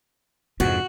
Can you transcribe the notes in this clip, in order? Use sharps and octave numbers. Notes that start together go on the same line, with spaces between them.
F2 G#2 C3 F#4